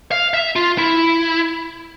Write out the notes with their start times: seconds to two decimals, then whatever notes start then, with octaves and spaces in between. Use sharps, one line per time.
0.11 F5
0.34 E5
0.56 F4
0.78 E4